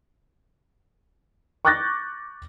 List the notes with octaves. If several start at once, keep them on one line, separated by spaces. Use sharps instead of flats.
C#6 D6 F#6 G6 A6 A#6